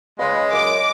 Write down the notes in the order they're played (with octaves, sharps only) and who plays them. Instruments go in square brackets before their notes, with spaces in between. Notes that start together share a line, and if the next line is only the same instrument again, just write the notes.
[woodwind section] C#3 F4 B4 [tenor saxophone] G#3 [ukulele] D#5
[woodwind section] F#2 [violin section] D6